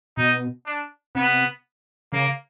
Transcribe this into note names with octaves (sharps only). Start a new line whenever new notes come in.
B2 D#4
D4
C3 B3
C#3 A#3